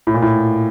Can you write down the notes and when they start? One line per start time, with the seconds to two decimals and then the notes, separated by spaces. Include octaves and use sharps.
0.07 A2
0.14 A#2
0.22 A2